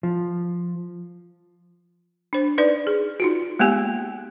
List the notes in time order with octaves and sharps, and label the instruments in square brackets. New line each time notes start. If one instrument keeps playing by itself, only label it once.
[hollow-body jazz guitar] F3
[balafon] D4 C5
D#4 B4 D5
G#4
D#4 F4 F#4
G#3 A#3 B3 G4 G#5